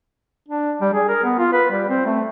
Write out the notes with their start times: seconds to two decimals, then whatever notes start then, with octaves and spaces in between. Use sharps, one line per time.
0.48 D4
0.81 G3
0.94 G#4
1.08 A#4
1.24 B3
1.38 F4
1.53 B4
1.71 G3
1.89 C4
2.06 A3